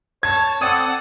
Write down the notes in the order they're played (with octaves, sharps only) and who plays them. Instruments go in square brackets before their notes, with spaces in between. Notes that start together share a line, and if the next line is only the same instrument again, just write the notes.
[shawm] C#5 [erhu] A5 [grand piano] G#6
[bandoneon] C4 D5 A5 [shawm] A4 [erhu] F#5 [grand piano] D#6 D#7